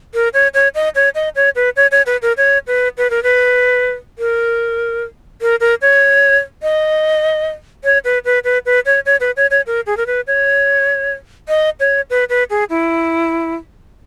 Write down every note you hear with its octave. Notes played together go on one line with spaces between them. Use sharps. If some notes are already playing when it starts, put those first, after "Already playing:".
A#4
C#5
C#5
D#5
C#5
D#5
C#5
B4
C#5
C#5
B4
A#4
C#5
B4
B4
A#4
B4
A#4
A#4
A#4
C#5
D#5
C#5
B4
B4
B4
B4
C#5
C#5
B4
C#5
C#5
A#4
G#4
A#4
B4
C#5
D#5
C#5
B4
B4
G#4
E4